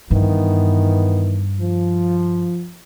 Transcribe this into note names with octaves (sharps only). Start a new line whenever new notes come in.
G2 D#3 E3 B3
F3